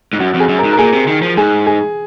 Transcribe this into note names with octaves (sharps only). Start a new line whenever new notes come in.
G#2
F#2 F#4
F2
G#4
F#2
A#4
G#2
A#4
A#2 G#4
C3
D#3
F3
G#2 G#4
G#4